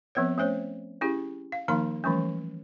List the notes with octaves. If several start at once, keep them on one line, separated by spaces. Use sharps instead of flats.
F3 B3 C4 B4 C#5
A3 C#4 C5 C#5
C#4 E4 G4 G#4
F5
D#3 F3 A#3 D#4 F5 C6
E3 F3 G3 A3 C#4